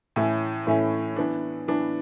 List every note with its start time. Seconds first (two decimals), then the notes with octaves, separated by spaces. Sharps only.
0.16 A2 E3 A3 C#4 E4
0.67 A2 E3 A3 C#4 E4
1.16 E3 B3 D4
1.68 E3 B3 D4